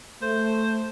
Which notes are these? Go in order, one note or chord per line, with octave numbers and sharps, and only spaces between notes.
A3 C5